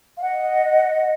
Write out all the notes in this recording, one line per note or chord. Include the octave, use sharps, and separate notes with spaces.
F5
D#5 F#5